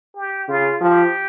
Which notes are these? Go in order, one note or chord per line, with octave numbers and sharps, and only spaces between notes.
G4
C#3 F4
F3 G4